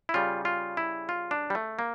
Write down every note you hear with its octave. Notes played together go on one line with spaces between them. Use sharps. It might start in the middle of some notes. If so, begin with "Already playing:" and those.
E4
C#3 G3 F4
F4
E4
F4
D4
G3
A3
A#3